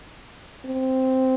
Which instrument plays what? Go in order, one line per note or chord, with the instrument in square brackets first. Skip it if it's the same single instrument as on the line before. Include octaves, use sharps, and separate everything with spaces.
[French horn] C4